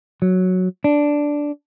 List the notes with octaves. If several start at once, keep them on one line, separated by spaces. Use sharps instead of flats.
F#3
D4